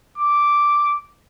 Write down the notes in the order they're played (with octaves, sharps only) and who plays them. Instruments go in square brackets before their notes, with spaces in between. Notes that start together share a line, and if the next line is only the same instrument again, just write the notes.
[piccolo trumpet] D6